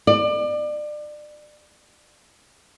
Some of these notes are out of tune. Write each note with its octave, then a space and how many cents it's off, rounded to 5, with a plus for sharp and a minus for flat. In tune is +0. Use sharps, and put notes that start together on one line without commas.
D5 +30